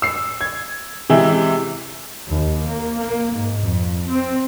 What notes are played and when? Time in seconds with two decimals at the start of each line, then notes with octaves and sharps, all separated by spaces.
0.02 E6 C7
0.41 G#6
1.10 C3 E3 G#3 E4
2.28 D#2
2.68 A#3
2.98 A#3
3.33 G#2
3.63 F2
4.09 C4